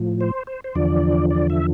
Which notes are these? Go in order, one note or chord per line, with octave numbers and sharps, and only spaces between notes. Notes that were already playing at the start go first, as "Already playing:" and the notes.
Already playing: A2 F3
C5
C5
C5
E2 D3 F3 D5
D5
E5